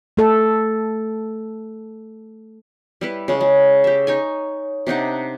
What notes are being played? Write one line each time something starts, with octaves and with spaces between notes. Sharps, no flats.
A3 A4
G3 E4 B4
C#3 G#3
G#3
G4 E5
D#4 C#5 G#5
C3 D4 D#4 F#5